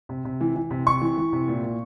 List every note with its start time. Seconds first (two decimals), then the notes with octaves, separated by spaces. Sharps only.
0.09 C3
0.25 C3
0.41 E3
0.56 E3
0.71 C3
0.86 C3 C#6
1.01 E3
1.18 E3
1.32 C3
1.48 A#2
1.63 A#2